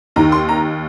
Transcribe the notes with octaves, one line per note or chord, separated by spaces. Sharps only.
D#2 D#3 A#5
C6
A#5